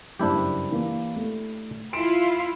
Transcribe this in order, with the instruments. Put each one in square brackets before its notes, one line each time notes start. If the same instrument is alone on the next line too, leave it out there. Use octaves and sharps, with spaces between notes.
[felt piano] F#1 G2 C5 [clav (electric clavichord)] D4 E4 G4
[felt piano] E3 A#3
A3
[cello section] E4 F4 [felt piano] C6 D7 E7